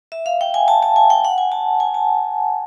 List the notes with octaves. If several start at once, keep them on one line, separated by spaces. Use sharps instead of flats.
E5
F5
G5
G#5
A5
A5
G#5
G5
F#5
G#5
A5
G#5
A5